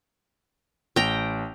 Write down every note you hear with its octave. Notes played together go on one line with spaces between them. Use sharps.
A1 G5 A#5